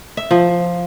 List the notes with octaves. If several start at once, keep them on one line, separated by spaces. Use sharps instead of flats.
E5
F3